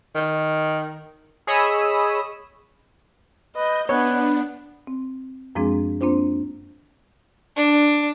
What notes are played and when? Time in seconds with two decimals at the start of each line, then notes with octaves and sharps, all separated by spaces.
0.15 D#3
1.47 G#4 C#5 D#5 B5 D#6 E6
3.56 B4 D#5 G6
3.89 B3 D4 B4 C#5
4.87 C4
5.55 F#2 F3 G#3 C4 D4 G#4
6.01 A#3 C4 D4 F4 C5
7.56 D4